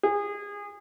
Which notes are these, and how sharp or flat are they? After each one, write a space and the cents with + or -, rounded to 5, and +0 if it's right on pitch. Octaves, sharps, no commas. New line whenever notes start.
G#4 -25